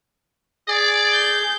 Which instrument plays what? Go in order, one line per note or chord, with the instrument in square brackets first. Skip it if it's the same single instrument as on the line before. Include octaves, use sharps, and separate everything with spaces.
[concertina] G#4 [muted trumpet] D5
[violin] G6